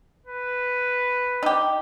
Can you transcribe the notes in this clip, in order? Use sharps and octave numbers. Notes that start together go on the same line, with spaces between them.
B4
D#4 G4